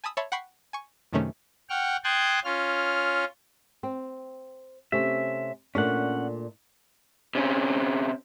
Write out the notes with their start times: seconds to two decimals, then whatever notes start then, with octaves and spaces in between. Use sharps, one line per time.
0.04 G#5 A5 B5 D#6 E6
0.17 C#5 E5 A5 B5 C6
0.32 F#5 G5 B5 C#6 B6 C7
0.73 G#5 C#6
1.13 F#2 C3 D#3 A3 C#4
1.70 F#5 G5 C#6 F6
2.04 G5 A5 C6 D#6 F#6 G#6
2.45 C#4 F4 F6
3.83 C4
4.92 C3 A3 C#4 E5
5.75 A#2 A3 C#4 D4 F#5
7.35 C3 C#4